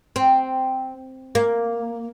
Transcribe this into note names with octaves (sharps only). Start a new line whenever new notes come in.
C4
A#3